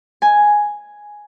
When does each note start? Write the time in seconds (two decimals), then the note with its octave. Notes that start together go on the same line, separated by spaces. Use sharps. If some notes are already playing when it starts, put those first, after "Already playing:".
0.22 G#5